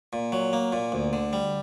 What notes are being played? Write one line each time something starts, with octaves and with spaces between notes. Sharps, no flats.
A#2
F#3
A#3
A#2
D2
D3
G3